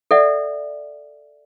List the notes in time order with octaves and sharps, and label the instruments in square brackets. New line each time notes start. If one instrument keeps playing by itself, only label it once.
[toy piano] A4 D5 E5 F#5